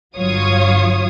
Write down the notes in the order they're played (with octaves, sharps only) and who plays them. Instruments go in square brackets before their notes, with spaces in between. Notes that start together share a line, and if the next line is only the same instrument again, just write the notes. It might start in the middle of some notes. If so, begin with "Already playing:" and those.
[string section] G1 F#3 F4 C#5 F5 D#6